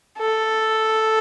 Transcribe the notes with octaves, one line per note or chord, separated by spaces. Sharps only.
A4